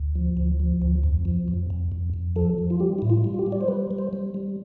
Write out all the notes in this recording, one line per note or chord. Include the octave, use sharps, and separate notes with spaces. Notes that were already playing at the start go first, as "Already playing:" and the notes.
Already playing: D2
F3
D2
F3
D2
F2
F3
F2
F2
F2
F2
F3 A4
F3
F4
G3 G4
A2 E4
F4
G3
F4
G4
G3
D5
C5
G3 B4
G3
C5
G3
G3